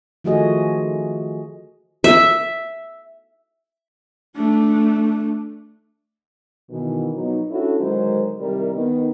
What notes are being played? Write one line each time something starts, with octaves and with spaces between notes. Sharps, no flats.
D#3 F3 A3 F#4 G#4 D#5
E5
A3 D4
B2 D#3 E3
B2 F3 F#3 B3 D#4
C#4 D4 E4 F#4 A4
D3 D#3 F#3 G#3 A#4 C5
C3 D#3 G3 E4 A#4
D#3 B3 D#4